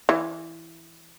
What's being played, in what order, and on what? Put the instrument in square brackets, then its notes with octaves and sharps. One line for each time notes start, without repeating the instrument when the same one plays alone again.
[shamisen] E3